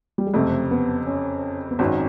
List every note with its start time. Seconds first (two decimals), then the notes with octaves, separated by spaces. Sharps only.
0.18 G3
0.26 G#3
0.34 F#1 F2 C3 A3
0.71 B3
1.06 C#4
1.71 B3
1.79 G#1 F#2 D#3 F#3 C4